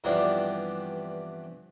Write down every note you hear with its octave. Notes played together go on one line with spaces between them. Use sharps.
G2 E3 F3 B3 C4 D4